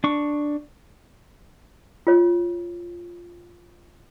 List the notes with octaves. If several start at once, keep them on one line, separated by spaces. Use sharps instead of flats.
D4 C#6
F4 C#5